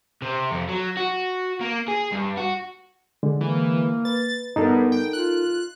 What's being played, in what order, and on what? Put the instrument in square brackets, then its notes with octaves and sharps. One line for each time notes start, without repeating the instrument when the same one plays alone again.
[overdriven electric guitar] C3
F2
F#3
F#4
A#3
G#4
G2
F#4
[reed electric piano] D3 G#3
[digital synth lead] E3 [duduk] A#3
[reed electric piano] B4 [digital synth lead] A6
[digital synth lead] G2 [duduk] B3 [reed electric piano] D#4 A4 A#4
[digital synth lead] G5
[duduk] F4 [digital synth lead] F#6